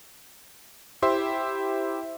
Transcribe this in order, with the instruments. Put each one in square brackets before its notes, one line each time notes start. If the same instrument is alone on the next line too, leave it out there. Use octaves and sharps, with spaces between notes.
[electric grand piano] E4 G4 C5 E5 C6